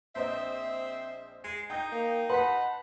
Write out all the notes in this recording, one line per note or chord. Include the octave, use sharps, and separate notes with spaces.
A#1 C4 C5 D#5 E5
G#3 C7
D#4 G5 D#6 G6
A#3
B4 F#5 A5 C6 B6